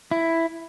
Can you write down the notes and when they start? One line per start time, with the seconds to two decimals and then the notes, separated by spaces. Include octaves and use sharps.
0.11 E4